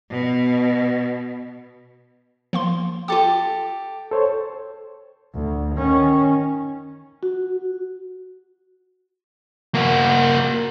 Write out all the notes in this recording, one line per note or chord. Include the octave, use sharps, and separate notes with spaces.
B2
F3 A#3 C6
F4 G4 A4 D6
A4 C5 C#5
D2
D#3 C#4
F#4
A#3 F#4